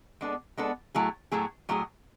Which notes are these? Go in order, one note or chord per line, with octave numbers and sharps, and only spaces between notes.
G#3 B3 D4 A4
G#3 B3 D4 A4
A2 F#3 A3 E4 G#4
A2 F#3 A3 E4 G#4
A2 F#3 A3 E4 G#4